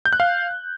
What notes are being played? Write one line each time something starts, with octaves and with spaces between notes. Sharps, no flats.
G6
F#6
F5